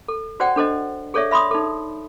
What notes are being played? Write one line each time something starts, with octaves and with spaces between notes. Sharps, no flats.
A4
F#4 C5 D5 F#5 G5
D4 A4 C5 D#5
G#4 A4 C#5 D5 E5
E5 B5 C6 D#6
D#4 A4